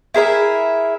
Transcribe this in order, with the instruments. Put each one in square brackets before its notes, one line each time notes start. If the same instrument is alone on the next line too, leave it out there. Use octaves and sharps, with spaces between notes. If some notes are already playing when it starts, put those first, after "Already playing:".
[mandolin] E4 G#4 A#4 E5